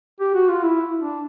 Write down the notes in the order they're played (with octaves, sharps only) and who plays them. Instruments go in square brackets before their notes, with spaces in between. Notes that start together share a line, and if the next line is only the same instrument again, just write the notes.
[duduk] G4
F#4
F4
E4
D4